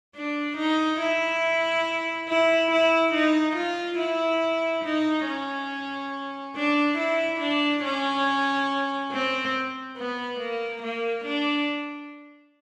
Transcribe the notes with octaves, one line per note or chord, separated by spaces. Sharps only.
D4
D#4
E4
E4
E4
D#4
F4
E4
D#4
C#4
D4
E4
D4
C#4
C4
B3
A#3
A#3
D4